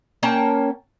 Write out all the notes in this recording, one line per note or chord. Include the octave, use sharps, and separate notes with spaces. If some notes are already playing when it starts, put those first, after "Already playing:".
A#3 C#4 G5 A5